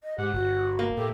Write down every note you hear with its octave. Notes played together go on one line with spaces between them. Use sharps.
D#5
G#2 G4 F#5
G1 F#4
A#3
A2 G4 A4